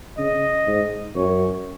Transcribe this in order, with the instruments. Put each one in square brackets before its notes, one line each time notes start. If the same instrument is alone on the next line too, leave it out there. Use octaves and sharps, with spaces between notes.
[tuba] C#3 [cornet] D#5
[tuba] G#2
[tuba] F#2 [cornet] C#5